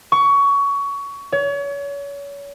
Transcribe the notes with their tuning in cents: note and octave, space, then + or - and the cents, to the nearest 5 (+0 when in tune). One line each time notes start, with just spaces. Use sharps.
C#6 +20
C#5 +35